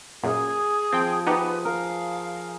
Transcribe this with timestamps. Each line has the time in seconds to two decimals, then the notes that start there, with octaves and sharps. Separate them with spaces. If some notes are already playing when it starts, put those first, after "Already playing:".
0.23 F#2 A#2 G#4
0.92 F3 C4 G5
1.26 B3 D#4 G4 G#4 B4
1.65 A#4 F5